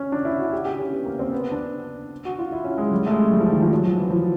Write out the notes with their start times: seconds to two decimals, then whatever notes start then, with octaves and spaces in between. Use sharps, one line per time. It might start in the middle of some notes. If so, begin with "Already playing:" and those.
Already playing: C#4
0.12 D4
0.25 E4
0.39 F#4
0.53 G4
0.65 G4
0.79 C#4
0.92 B3
1.06 A#3
1.19 C4
1.32 B3
1.52 D4
2.25 F#4
2.39 F4
2.52 E4
2.64 C#4
2.78 G#3
2.92 G3
3.06 A3
3.11 G#3
3.31 G3
3.41 F3
3.51 D#3
3.61 F3
3.72 F#3
3.85 F3
3.98 E3
4.10 F3